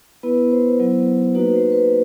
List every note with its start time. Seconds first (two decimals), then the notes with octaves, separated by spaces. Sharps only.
0.23 B3 E4 B4
0.51 C5
0.79 F#3 B3 E4
1.35 A#3 D#4 F#4 B4
1.49 B4
1.53 C5
1.72 B4